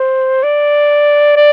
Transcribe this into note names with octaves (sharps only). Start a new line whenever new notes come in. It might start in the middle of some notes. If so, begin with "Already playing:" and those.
Already playing: C5
D5
D5